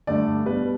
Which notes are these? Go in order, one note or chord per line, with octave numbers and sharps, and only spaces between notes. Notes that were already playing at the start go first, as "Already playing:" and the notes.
G2 D3 A3 D5
B2 G3 B3 B4